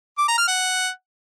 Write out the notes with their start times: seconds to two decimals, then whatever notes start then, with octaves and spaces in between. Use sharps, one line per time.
0.18 D6
0.28 A#5
0.38 F6
0.48 F#5